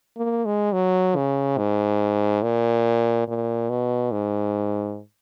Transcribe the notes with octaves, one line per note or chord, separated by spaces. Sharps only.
A#3
G#3
F#3
C#3
G#2
A#2
A#2
B2
G#2